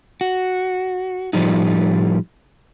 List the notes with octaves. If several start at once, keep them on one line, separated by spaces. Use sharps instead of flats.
F#4
A2 F3 G3 D#4